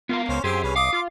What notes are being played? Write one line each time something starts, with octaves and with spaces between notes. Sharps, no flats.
B3 F4 A#4 F5
C#2 C#4 C5
F#2 C4 G4 G#4 C6
C2 C#4 B4
F5 D6 D#6
F4 D6